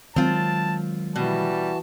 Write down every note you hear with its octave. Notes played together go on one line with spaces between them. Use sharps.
D#3 F#3 G#3 C4 F4 A5
B2 E3 G3 F#4 A5